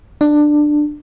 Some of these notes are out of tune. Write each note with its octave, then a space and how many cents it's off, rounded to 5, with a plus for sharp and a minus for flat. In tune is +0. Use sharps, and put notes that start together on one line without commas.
D4 +15